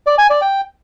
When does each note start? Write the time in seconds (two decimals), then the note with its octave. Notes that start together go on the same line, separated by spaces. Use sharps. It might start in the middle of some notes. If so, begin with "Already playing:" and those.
0.07 D5
0.18 G#5
0.30 D5
0.42 G5